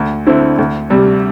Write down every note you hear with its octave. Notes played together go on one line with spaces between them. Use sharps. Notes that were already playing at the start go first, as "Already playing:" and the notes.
Already playing: D2
D3 C4 E4
D2
C3 G3